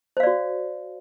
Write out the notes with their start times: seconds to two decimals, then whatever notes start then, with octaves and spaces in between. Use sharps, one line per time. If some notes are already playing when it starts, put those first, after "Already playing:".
0.17 C5
0.20 F5
0.23 D5
0.27 F#4